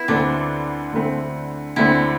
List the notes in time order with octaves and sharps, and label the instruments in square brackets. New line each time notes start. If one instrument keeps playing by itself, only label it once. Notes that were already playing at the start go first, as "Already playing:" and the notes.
Already playing: [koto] B3 E4
[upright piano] D2 D3 A3 C4 [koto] D4
[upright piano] D2 D3 A3 C4
[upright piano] D2 D3 A3 C4 [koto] E4